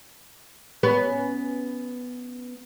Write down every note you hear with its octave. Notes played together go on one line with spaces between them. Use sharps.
B3 C#4 B4